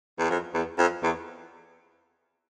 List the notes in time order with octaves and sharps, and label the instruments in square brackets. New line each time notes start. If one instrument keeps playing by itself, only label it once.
[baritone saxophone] E2
F2
E2
F2
E2